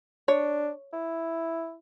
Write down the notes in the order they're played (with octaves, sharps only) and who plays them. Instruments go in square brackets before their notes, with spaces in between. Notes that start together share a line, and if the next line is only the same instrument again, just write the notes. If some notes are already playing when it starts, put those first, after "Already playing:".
[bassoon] D4 [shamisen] C#5
[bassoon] E4